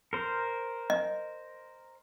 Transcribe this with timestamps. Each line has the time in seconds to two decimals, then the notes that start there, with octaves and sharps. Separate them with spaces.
0.13 A#4 C5
0.90 D#5